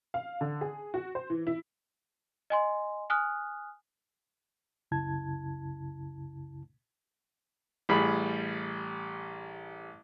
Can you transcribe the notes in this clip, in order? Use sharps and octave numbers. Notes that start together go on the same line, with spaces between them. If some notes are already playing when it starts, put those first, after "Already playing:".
F5
D3
G#4
F#4
C5
E3
E4
D#5 G#5 C6
G#5 D#6 F6 F#6
C2 F#2 C#3 E4 A5 G#6
A1 G3 G#4 B5